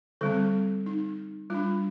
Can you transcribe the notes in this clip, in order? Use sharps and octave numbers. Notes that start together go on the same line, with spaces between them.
D3 G3 C4 A4
D#4
G3 D4 F4